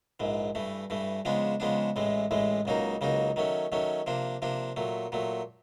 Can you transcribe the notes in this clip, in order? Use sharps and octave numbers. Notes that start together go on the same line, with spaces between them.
A#1 G#2 E3
G2 E3 A3
G2 E3 A3
C#3 F3 G#3 B3 D4
C#3 F3 G#3 B3 D4
A1 A2 E3 G#3
A1 A2 E3 G#3
C#2 C#3 F#3 A#3 D#4
C#2 C#3 F#3 A#3 D#4
D#3 F#3 A3 C#4
D#3 F#3 A3 C#4
C3 F3 A#3 D4
C3 F3 A#3 D4
A#2 F#3 A3
A#2 F#3 A3